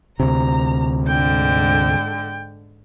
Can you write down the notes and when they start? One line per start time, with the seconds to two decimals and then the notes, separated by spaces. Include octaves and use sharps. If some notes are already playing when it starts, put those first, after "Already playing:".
0.20 D2 C3 A#5
1.07 G#2 D3 G5